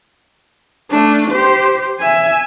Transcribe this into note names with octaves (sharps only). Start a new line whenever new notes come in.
A3 D4
G4 C5
E5 G#5